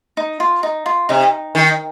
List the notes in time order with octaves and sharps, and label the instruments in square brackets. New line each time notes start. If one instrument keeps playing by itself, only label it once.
[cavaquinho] D#4
F4
D#4
F4
[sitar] C3 [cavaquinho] D#4
[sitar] D#3